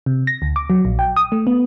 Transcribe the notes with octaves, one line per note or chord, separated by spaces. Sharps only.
C3
A#6
D2
D6
F#3
A#1
G5
D#6
A3
B3